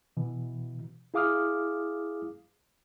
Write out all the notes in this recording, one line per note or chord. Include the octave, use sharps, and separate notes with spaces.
B2 E3
E4 G#4 F5 D6 D#6 F6